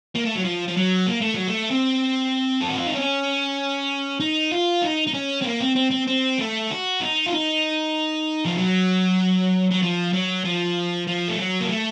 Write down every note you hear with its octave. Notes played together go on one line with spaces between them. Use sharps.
A#3
A3
F#3
F3
F3
F#3
A#3
A3
F#3
A3
C4
A4
F#4
F4
D#4
C#4
D#4
F4
D#4
D#4
C#4
C4
A#3
C4
C4
C4
C4
A3
F#4
D#4
F4
D#4
F3
F#3
F#3
F3
F#3
F3
F3
A3
F#3
A#3
A3